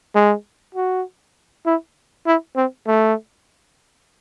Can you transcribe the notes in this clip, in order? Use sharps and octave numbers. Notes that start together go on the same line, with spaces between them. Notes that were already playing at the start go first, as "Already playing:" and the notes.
G#3
F#4
E4
E4
C4
A3